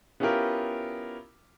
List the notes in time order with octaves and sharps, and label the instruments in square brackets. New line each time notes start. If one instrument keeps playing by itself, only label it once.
[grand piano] B3 C#4 E4 F4 G4 A#4